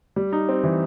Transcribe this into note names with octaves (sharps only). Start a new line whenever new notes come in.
G3
D#4
C4
E3